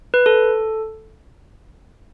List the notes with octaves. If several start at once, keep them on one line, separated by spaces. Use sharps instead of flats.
B4
A4